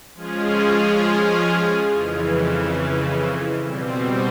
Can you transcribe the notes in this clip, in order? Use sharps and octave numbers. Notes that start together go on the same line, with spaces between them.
F3 G#3 C#4 F4 G#4
F2 C#3 E3
B2 G3 C4